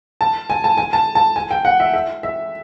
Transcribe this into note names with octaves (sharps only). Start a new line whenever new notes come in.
A5
G#5
A5
G#5
A5
A5
G#5
G5
F#5
E5
E5
E5